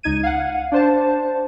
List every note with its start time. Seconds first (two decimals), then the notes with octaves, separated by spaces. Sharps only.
0.03 C#2 D#4 G#6 D#7
0.23 F5 F#5
0.72 D4 C5 A5